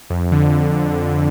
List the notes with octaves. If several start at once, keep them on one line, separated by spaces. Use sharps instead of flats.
F2
D3